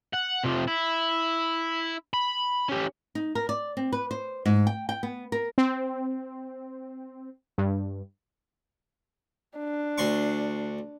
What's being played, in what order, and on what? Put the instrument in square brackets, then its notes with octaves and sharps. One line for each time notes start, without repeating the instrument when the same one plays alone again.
[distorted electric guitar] F#5
C3 F3
E4
B5
C#4 G4
[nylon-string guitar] D#4
A#4
D5
C4
B4
C5
G#2
G5
G5
B3
A#4
[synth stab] C4
G2
[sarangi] D4
[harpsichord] D2 C6 C#6